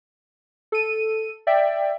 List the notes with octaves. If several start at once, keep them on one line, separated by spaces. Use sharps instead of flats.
A4 D#7
D5 E5 G5